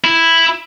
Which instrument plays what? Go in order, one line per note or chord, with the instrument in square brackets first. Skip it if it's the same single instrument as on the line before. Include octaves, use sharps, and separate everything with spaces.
[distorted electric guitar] E4